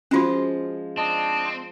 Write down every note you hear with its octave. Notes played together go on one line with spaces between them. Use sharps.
F3 G#3 C#4 F4 F#4
C4 D4 D#5 A5